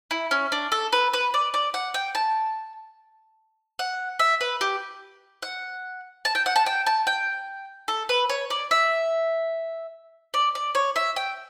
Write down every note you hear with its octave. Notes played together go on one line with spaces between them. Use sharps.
E4
C#4
D4
A4
B4
B4
D5
D5
F#5
G5
A5
F#5
E5
B4
G4
F#5
A5
G5
F#5
A5
G5
A5
G5
A4
B4
C#5
D5
E5
D5
D5
C#5
E5
G5